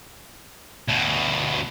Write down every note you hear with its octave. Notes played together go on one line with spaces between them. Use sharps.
D2 B2